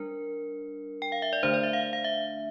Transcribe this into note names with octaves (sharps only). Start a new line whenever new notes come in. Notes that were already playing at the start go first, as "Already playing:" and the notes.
Already playing: G3 D4 A#4
G5
F5
E5
D5
D3 A3 D4 C5
D5
E5
F5
F5
E5